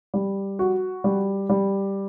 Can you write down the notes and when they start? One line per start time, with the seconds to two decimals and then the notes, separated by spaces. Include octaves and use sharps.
0.14 G3
0.59 F#4
1.04 G3
1.50 G3